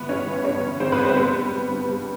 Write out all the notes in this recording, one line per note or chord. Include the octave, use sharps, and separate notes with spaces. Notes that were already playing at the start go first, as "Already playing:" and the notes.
Already playing: G1 E3 B3 B4
G2 C#4 C#5
G1
G2 C#4 C#5
G2
G1 C4 C5
B3 B4
G2
C4 C5
G3 B3 B4
G3
G3
G2
G3